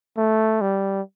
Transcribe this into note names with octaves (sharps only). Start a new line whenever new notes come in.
A3
G3